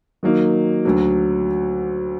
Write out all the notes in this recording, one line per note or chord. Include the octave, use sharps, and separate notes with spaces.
D#3 F#3 A#3 D#4
D2 D3 F#3